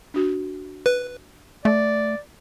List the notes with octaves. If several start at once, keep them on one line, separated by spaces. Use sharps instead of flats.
D4 F#4
B4
A3 D5